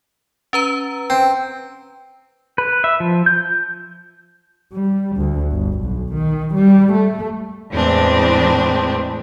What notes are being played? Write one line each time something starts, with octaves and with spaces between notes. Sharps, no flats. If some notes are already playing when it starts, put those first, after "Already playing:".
C#4 B4 A#5
C4
B4
E5
F3
G6
G3
D2
G1
B1
D#3
G3
A3
E2 A2 E3 G#3 C4 D4